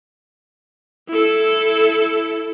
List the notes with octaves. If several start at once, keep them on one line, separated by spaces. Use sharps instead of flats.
E4 A4